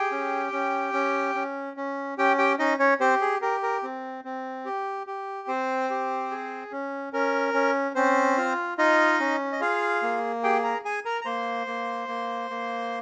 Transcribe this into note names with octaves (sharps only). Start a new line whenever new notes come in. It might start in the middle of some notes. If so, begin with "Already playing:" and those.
Already playing: G4 G#4 G5
C#4
C#4
C#4
C#4
C#4
C#4 G4 G5
G4 G5
C#4 D#4 D#5
C#4 C#5
C4 G4 C5
G#4
G4 A#4
A#4
C4
C4
G4
G4
C4 C5
G4
G#4
C#4
C#4 A#4
C#4
C4 C#4 C5
F4
D#4 F4 D#5
C#4
D#5
F4 G#4 F5
A#3
G4 G#4 G5
A#4 A#5
G#4 G#5
A#4 A#5
A#5
A#3 C5 C6
A#3
A#3
A#3